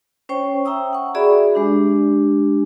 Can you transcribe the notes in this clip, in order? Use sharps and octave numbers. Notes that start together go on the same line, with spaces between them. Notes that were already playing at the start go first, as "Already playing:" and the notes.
C#4 C5 C#5 G5 C#6
E5 G5 A#5 D#6 E6
F#5 C#6
F#4 G#4 D5 E5 B5
G#3 D4 G4